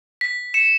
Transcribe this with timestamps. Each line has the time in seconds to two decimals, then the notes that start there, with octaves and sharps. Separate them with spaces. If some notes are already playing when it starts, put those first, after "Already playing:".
0.21 B6
0.54 C#7 E7